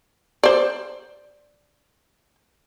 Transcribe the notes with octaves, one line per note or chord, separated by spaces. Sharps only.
C5 D5